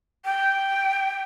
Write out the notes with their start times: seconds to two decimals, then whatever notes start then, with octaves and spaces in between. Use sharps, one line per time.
0.25 G5